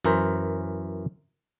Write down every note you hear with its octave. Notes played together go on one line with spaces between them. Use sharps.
F#2 E3 A#4 C5